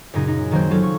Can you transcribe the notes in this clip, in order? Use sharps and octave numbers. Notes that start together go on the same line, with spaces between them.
F#2 A#2 C#3 D#4 G#4
D#4
D#3 F#3 A#3 C4 C5
F#3 F4 G#4 A4
C#6